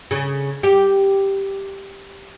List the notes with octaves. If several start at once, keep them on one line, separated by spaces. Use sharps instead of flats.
C#3
G4